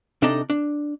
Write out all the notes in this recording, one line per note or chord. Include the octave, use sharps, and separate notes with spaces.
C3 D4 D#4 A4 D5 D#5
D4